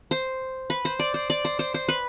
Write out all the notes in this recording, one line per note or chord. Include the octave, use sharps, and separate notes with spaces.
C5
B4
C5
D5
C5
D5
C5
C5
C5
B4